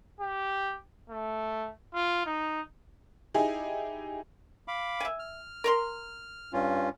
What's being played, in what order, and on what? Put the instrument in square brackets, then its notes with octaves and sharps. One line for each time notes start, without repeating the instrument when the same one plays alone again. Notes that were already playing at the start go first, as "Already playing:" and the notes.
[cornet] G4
A3
F4
D#4
[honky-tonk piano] D#4 E4 G4 G#4 G#5
[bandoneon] F5 B5 D6
[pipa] E5 G#5
[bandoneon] F6
[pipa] A#4 A#5 C6
[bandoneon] G2 C#4 F4